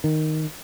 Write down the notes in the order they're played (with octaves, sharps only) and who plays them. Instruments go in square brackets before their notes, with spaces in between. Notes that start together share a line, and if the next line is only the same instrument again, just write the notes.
[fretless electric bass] D#3